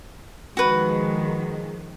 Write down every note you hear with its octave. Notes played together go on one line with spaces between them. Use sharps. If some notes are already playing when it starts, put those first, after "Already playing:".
D#3 F3 G#3 F#4 B4